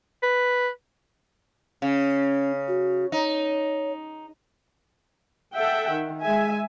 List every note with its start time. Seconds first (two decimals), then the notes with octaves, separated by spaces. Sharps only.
0.23 B4
1.82 C#3 C#4
2.68 F#4
3.12 D#4 C#5
5.55 A4 E5 F#5 G5
5.90 D#3
6.22 G#3 E5 G#5